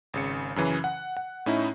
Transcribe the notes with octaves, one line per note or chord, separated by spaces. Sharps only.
G#1 C#3 C#7
F#2 C#3 E3
F#5
F#5
A2 C#4 D#4 E4